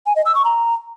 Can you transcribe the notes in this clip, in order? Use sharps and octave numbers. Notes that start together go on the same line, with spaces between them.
G#5
D#5
E6
C#6
A#5